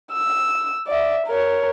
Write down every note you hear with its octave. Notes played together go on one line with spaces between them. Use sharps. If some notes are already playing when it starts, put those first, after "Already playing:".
E6
D5 E5
A#4 C#5